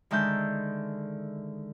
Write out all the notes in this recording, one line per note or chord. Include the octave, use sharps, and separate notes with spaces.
D3 D#3 G#3 E5 A5 G6